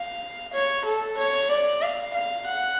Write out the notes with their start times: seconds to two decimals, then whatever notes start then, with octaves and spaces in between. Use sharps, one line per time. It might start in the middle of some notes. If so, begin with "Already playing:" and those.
Already playing: F5
0.53 C#5
0.85 A4
1.18 C#5
1.50 D5
1.82 F5
2.14 F5
2.46 F#5